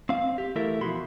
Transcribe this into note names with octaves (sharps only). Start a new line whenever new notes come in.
C4 F5
G4
E3 A3 E4 A4 A#4 E5
B2 F3 E4 F#4 B5 C6